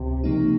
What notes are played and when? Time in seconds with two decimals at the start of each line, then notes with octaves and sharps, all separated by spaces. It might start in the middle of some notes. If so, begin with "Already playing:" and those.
Already playing: C#2 C3
0.24 C#3 F3 A#3 D#4